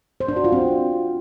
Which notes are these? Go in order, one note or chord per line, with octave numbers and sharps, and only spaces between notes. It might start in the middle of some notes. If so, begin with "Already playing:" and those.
C5
D4
F#4
F4
C4